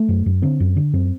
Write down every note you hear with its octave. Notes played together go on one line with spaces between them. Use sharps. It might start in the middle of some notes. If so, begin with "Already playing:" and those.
Already playing: A3
F#2
F#2
D3 C4
F#2
D3
F#2 C4